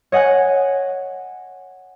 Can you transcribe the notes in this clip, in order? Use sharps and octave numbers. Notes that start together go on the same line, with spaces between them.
C#5 D#5 F#5 G#5 F#6